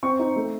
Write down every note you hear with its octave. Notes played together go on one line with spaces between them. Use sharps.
C4 C#6
D#4
A3